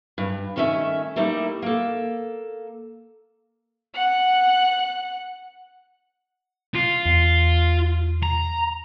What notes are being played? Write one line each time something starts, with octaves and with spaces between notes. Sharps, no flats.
G2
D#3 A3 C#4 C5 E5 G#5
G3 A3 A#3 D#4 E4
A#3 A4
F#5 F#6
F4
E2
A#5